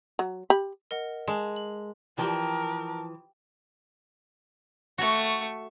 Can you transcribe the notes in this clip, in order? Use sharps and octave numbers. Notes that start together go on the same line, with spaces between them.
F#3
G4 B5
A#4 D#5 F#5
G#3 A5
F#7
E3 F3 G4 A#4 G5 A5
A3 F#4 C#6